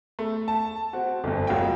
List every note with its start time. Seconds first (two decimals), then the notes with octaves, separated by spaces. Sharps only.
0.19 A3
0.48 A5
0.93 C4 F#4
1.24 G1 F2
1.47 E1 F#3 F4 G5